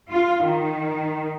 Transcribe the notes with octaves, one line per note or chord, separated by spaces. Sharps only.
F4
D#3